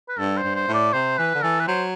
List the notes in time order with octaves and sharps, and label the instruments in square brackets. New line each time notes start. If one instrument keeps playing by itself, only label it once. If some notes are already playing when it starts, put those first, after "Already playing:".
[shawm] B4
[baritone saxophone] G2 [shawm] A4
[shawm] C5
[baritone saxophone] G2
[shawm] C5
[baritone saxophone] A2
[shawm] D5
[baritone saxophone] C3 [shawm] C5
[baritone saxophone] E3 [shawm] B4
[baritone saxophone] D3
[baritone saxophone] E3 [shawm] A4
[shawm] B4
[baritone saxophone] F#3 [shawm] C5